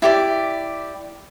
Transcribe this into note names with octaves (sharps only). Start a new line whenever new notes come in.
E4 G4 D5